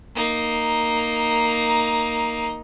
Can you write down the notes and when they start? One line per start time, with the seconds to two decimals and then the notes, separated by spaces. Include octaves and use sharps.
0.16 A#3 D#4